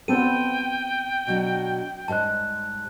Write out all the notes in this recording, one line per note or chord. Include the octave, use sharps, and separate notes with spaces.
B3 C4 A4 G5 D#7
B2 F#3 D4
G#2 G3 C5 A5 F#6